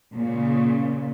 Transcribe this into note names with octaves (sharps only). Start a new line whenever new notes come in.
A#2 C#3